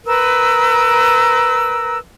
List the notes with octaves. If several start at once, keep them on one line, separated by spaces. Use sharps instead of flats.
A#4 B4 E6